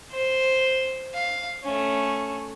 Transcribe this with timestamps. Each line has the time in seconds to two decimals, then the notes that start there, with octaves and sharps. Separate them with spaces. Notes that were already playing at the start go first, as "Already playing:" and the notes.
0.12 C5
1.14 F5
1.64 A3 C#4